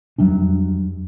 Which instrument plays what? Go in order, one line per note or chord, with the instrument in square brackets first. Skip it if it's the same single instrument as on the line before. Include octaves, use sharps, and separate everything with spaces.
[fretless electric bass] F2 F#3 G3 D4